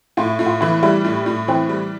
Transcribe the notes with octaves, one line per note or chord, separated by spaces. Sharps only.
A2 F4
A2
F4
E3 E4
G3 E4
A2
A2
E3 C4
G3